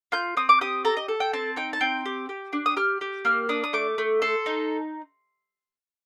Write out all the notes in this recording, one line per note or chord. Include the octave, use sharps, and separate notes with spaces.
F4 G6
C4 D#6
D6
G4 D#6
A4 A#5
D#5
A4
G5
C4 A5
D#4 G5
A5
C4 G5
G4
G4
D4
D#6
G4 F6
G4
A#3 F6
D4 D#6
D#6
A3 D6
A3
A4 C6
D#4